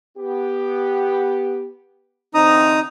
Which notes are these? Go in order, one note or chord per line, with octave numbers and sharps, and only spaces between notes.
B3 G4
E2 D3 C4 D#4 A#5 D#6